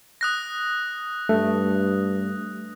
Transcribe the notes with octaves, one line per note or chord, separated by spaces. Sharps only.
D#6 F#6 A#6
G2 A3